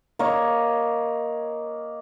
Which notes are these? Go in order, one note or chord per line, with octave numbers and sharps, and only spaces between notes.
A#3 C#5 D#5